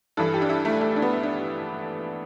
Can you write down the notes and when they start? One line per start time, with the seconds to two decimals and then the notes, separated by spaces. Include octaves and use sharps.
0.17 G2 E3 A4
0.34 G4
0.42 D4
0.50 E4
0.65 A3
0.81 A3
0.96 D4
1.02 B3
1.23 D4